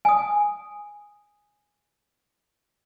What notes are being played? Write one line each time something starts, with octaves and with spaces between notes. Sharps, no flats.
G#5 D#6